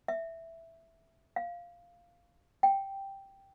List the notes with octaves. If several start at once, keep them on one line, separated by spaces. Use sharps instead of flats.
E5
F5
G5